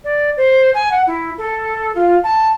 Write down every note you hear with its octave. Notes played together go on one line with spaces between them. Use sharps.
D5
C5
G#5
F#5
E4
A4
F4
A5